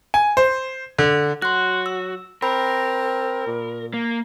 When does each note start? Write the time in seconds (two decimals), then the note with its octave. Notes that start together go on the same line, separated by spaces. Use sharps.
0.14 G#5
0.37 C5
0.98 D3
1.42 F#3 F#4 C6 F#6
1.86 E6
2.42 C4 A#4 B5
3.47 A#2
3.93 A#3